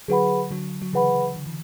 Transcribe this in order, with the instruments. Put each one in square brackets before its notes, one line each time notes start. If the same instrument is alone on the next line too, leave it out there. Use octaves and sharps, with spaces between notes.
[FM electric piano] D3 F#3 [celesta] G#4 B4 F#5 B5
[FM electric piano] D3 F#3
F#3
[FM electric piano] C#3 E3 [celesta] G#4 B4 F#5 B5
[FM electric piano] D3
E3